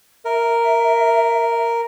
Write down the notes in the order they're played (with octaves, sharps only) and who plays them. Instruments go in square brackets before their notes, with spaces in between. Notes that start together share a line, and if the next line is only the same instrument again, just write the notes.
[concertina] A#4 [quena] E5